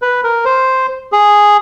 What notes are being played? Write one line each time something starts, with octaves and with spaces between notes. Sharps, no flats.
B4
A#4
C5
G#4